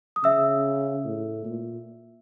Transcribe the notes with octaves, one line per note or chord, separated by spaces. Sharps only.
D#6
C#3 E5 E6
A2
A#2